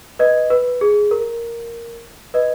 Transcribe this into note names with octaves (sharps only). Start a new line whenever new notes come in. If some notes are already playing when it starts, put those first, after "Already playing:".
B4 D#5
B4
G#4
A#4
B4 D#5